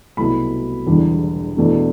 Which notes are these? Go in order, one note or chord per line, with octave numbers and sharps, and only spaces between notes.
C2 B2 F#3 A3 B5
E1 E2 D3 G3
E1 E2 B2 A3 D4